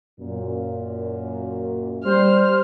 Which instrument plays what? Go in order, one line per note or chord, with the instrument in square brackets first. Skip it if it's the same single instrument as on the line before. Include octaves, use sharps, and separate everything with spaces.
[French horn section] F#2 A#2
[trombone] G3 [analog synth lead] C5 [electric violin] F6